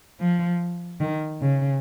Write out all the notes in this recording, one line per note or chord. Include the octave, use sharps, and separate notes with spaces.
F3
D#3
C#3